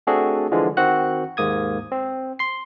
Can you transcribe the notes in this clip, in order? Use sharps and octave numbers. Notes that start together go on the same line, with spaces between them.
A3 C4 D4 F#4 G#4 A4
D3 E3 F3 G#3
D#3 C4 F#4 F#5 F#6
D#2 G#2 A#3 D#6 G#6
C4
C6 C7